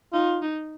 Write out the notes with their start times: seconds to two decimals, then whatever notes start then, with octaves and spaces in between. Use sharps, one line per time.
0.13 D#4 F4
0.42 D#4